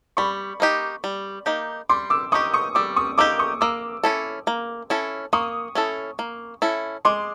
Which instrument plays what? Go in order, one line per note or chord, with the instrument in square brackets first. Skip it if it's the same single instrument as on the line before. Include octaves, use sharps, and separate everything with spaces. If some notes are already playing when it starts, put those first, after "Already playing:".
[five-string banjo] G3 [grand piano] B5 C#6
[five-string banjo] A#3 D#4 G4
G3
A#3 D#4 G4
[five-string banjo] G3 [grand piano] C6 D6
[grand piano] D6 E6
[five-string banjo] A#3 D#4 G4 [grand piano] C#6 D#6
[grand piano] C#6 D#6
[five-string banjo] G3 [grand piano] D6 E6
[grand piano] C#6 D#6
[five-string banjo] A#3 D#4 G4 [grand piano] D6 E6
[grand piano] C#6 D#6
[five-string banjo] A#3 [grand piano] D6 E6
[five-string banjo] C#4 E4 A4
A#3
C#4 E4 A4
[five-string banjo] A#3 [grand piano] C#6 D#6
[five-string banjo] C#4 E4 A4
A#3
C#4 E4 A4
[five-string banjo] G#3 [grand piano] C6 D6